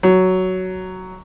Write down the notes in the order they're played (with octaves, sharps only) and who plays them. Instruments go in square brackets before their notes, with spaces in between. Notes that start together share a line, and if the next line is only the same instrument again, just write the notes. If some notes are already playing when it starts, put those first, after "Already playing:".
[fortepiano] F#3